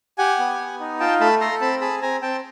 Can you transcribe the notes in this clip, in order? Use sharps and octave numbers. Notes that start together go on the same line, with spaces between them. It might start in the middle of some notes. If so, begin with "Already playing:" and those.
G4 F#5 G#5
B3
B3
D#4
F4 G5 A5
A3 A5 B5
A4 A#5 C6
C4 A5 B5
G#4 A5 B5
C4 G#5 A#5
C4 G5 A5